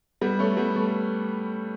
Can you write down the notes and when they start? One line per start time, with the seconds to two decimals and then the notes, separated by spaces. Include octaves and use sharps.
0.21 G3 B3
0.39 A3 C#4
0.57 G3 B3
0.76 A3